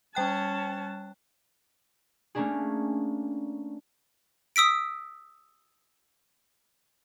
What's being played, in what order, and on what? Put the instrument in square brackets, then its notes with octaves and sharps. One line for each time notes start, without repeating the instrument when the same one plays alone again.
[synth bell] G3 G5 F#6 [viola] C#4 A5
[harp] A3 A#3 C#4 D4 G#4
[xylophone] D#6 E6 B6 D7